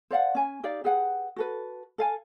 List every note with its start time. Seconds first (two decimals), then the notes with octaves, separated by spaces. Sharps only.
0.11 C5 D5 F5 F#5
0.35 C#4 G#5
0.63 D#4 G4 D5 F5
0.84 G4 G#4 B4 F#5
1.36 F#4 A4 B4
1.98 A4 F5 G#5